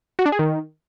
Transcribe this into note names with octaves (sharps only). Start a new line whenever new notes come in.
F#4
D4
G#4
D#3